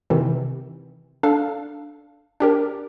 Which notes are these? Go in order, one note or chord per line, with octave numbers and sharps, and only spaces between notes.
C3 D#3 E3
D4 A4 F5
D4 G4 A#4